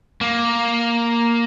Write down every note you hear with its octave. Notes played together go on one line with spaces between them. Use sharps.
A#3